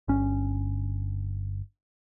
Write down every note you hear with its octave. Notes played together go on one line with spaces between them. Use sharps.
G1 C#4